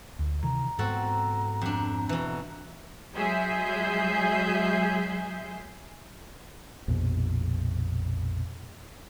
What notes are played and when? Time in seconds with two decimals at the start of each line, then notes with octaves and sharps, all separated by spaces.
0.19 D2
0.43 C3 D#3 E3 A#5
0.79 G#2 B3 C4 F#4 A4
1.61 F2 D4
2.09 B2 E3
3.14 F#3 G#3 G#4 E5 G6 C7
6.88 A#1 F2 B2